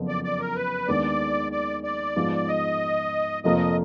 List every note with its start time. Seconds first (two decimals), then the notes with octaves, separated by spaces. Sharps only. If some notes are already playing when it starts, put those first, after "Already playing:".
Already playing: F#1 F2 F3 B3
0.08 D5
0.24 D5
0.40 A#4
0.56 B4
0.88 D#2 D#3 G#3 B3 D4 D5
1.52 D5
1.83 D5
2.16 G#2 F3 B3 F4 G#4
2.48 D#5
3.44 F1 F2 F3 A#3 D#5